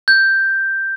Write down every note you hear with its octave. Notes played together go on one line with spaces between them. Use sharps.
G6